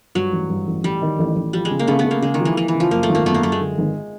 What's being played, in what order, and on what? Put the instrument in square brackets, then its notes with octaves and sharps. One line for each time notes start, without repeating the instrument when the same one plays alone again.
[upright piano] G2 [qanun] F#3
[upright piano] A1
G2
A1
[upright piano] A1 [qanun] G3
[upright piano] D#3
A1
A1
[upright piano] F3 [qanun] G3
[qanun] G#3
[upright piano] C#3
[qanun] A#3
[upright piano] C#3 [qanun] A3 B3
[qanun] A3 B3
[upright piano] C#3
[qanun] A#3
[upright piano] C#3 [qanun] G#3
[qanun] D#3
[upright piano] F3
[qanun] E3
[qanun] E3 [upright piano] F3
[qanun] E3
[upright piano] C#3
[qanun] F3
[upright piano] F#2 [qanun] A#3
[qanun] A3
[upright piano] G#1
[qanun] A#3
[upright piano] F#2 [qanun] A3 B3
[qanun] A#3
[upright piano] F#2 [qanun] A3
[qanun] G#3
[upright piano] D3
G#1